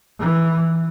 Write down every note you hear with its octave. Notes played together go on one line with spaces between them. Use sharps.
E3